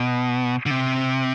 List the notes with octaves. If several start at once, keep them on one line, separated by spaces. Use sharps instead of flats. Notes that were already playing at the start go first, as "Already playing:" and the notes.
Already playing: B2
D3
C3